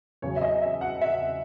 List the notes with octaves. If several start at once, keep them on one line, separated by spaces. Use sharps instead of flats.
E2 C#3 F#3 C#5
E5
D#5
E5
F#5
E5